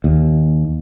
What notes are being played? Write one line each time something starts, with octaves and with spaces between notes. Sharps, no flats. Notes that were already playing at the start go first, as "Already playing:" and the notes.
D#2